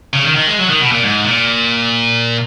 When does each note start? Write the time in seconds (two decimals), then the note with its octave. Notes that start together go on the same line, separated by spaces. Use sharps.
0.13 C#3
0.24 D#3
0.36 D#3
0.47 G#3
0.59 F#3
0.69 D#3
0.80 B2
0.92 A#2
1.03 G#2
1.25 A#2